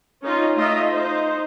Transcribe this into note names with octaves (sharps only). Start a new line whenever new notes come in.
C#4 D#4 F4
A3 D#4 F4 D#5 E5
D#4 C5